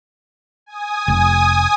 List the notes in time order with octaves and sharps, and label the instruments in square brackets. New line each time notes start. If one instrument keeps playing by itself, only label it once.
[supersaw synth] G#5 D#6
[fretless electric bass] F1